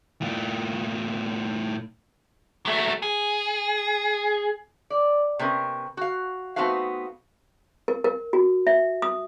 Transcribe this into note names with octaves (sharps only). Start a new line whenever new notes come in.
A2 F4
F#3 A3
G#4
D5
C3 B3 C#4 A#4
F#4 F5
A3 B3 C4 D#4 F#4 F5
A#4
A#4
F#4
E5
D#6